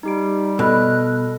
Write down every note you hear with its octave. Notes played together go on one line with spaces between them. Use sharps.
G3 D#4 G4 D7
B2 A4 D#5 F6 F#6